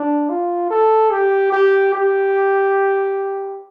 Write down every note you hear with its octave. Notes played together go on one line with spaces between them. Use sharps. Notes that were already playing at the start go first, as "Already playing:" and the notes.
Already playing: D4
F4
A4
G4
G4
G4